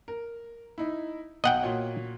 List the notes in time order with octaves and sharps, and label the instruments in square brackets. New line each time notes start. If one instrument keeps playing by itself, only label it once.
[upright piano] A#4
D#4 E4
[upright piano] B1 [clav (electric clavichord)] D#5 F#5 G5
[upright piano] A#2 F#4 C#5